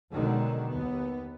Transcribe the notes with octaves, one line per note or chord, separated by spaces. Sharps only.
B2 D3 D#3 F#3 G#3
D#2 B3